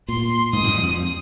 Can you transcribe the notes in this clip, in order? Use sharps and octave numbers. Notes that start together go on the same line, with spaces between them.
A#2 C6
G#2 D#6
F2
G2
F2